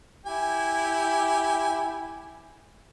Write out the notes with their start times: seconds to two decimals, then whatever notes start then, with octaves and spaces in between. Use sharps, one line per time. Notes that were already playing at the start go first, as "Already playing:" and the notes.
0.26 E4 G4 G#5